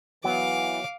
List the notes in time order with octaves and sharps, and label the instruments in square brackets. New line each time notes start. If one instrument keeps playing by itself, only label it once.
[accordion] E3 [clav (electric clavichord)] F#3 B3 [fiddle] F5 D6